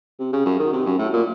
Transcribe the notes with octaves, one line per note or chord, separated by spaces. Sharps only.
C3
C#3
F#2
D#3
C3
F#2
A2
A#2